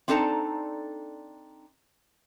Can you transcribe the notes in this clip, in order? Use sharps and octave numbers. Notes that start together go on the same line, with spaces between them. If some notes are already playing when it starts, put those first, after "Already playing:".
C4 D4 D#4 A4 A5 A#5